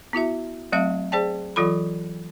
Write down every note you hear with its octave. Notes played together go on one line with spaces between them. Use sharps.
B3 E4 F#4 E5
F#3 A3 C4 E5 F5
G#4 C5 D5 G5 A5
E3 F#3 F4 A4 B5